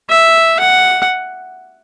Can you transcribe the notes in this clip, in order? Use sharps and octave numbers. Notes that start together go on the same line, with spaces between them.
E5
F#5